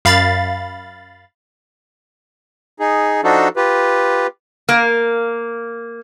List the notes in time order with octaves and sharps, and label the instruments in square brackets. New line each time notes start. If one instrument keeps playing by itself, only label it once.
[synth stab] F#2 F5 B5 A6
[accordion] D#4 G#4
F3 D4 D#4 F#4 A4
F4 G4 B4
[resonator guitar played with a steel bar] A#3